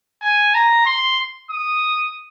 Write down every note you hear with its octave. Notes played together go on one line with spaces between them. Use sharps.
G#5
A#5
C6
D#6